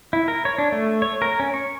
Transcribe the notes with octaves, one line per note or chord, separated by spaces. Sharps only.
E4
A#4
C#5
D4
A3
C#5
A#4
C#4
C#6